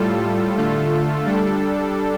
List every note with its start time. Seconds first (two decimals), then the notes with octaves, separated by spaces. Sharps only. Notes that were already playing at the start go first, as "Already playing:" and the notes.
Already playing: A2 G3 F4 A4
0.57 D3 A3 F4 A4
1.25 G3 D4 A4